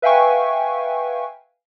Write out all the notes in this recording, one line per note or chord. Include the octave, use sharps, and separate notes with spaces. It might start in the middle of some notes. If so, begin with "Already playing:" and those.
B4 E5 F5 G5 G#5 C#6